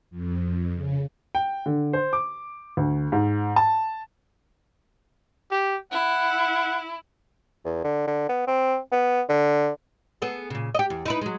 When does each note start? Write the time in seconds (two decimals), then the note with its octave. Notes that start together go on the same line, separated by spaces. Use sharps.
0.10 F2
0.74 C#3
1.35 G5
1.66 D3
1.93 C5
2.13 D6
2.77 D2
3.12 G#2
3.56 A5
5.51 G4
5.92 E4 F#5
7.65 E2
7.84 D3
8.07 D3
8.29 B3
8.47 C4
8.92 B3
9.29 D3
10.22 B3 G#4 A4
10.50 A#2 C#3
10.75 G4 D#5
10.90 E2
11.06 D#4 E4 B4
11.21 F#3 G#3